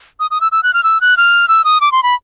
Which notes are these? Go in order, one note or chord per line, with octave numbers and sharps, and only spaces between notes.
D#6
D#6
E6
E6
F#6
F6
E6
F#6
F6
E6
D#6
D6
C6
B5